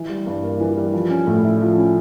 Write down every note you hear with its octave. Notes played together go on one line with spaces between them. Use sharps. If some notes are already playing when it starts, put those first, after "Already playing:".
Already playing: E3
G3
G2
A#3
E3
G3
F3
C#4
A2
E4
F3
C#4